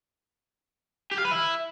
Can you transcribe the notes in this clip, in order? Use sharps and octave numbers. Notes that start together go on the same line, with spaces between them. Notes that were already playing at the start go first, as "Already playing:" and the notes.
G4
F5
B4
E4